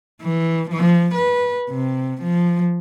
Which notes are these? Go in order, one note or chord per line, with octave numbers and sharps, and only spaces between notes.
E3
F3
B4
C3
F3